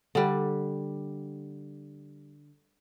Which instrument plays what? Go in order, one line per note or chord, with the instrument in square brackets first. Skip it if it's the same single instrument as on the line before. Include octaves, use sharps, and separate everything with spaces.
[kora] D3 G3